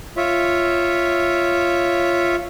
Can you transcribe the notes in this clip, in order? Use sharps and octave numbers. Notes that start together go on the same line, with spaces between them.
F4 C#5 E5